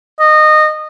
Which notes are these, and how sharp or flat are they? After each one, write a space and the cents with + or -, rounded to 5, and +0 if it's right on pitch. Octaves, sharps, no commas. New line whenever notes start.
D#5 -20